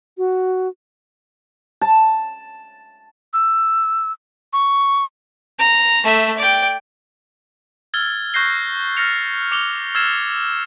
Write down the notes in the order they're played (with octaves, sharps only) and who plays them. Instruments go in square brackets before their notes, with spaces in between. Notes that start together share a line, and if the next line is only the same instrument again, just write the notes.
[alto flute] F#4
[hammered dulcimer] A5
[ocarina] E6
C#6
[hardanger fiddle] A#5
A3 E5
D5 G5
[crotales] E6 F6 G#6 A6 G7
C#6 F#6 G6 A#6 C7 G7
F6 A6 A#6 C#7 F7
D6 C#7 F7 G7
E6 F6 G#6 A6 C7 E7